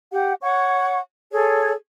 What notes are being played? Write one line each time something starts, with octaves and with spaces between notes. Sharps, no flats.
G4 F#5
C#5 F#5 C#6
G#4 A4 C#5